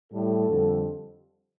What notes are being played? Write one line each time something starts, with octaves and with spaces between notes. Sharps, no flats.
A2 G3 A4
F2 D3 G3